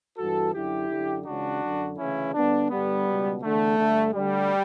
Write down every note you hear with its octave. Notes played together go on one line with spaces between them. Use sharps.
G2 E3 F#4 A4
F#2 D3 E4 G4
F#2 D3
C#2 C#3 E3 D4 F#4
F#2 D3
D2 C#3 E3 C#4 E4
G2 D3 B3 D4
G2 D3 G3 B3
C#2 B2
E2 D3 A3
D3
G2
D2 D3 G3